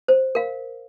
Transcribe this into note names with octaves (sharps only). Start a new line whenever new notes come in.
C5
A#4 F5